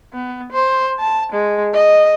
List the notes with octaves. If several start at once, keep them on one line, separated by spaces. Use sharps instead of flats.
B3
C5
A5
G#3
D#5